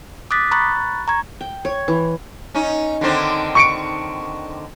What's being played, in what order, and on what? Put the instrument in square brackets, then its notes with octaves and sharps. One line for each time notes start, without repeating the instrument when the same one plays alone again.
[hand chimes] D6 D#6 F#6 A6 B6
A#5 B5 C#6 F#6 A6
A#5 C#6 G#6
[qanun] G5
C#5
E3
[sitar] C#4 D#4
D3 D#3 C4
[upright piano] C#6 C#7 D7